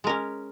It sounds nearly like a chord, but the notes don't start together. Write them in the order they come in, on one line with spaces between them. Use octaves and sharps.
G#3 A#4 C#4